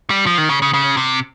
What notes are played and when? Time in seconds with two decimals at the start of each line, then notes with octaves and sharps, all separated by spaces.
0.10 G3
0.26 F3
0.38 D#3
0.49 C#3
0.62 C#3
0.74 C#3
0.97 C3